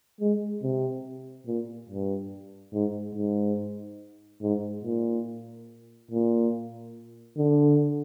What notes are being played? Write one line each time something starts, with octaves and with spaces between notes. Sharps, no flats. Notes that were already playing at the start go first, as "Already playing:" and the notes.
G#3
C3
A#2
G2
G#2
G#2
G#2
A#2
A#2
D3